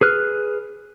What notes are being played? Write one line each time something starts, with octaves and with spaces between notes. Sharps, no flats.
G#4 B4 F6 F#6